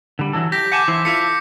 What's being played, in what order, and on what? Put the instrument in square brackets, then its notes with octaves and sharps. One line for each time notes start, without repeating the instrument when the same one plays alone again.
[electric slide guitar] D3 G3
E3 F#3 A4
[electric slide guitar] G4 [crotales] G6 A#6 B6
[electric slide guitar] F#5 G#5 A5 [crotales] D6 G6
[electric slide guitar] E3 E4 C5
[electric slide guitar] E4 F4 A4 [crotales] B6 C#7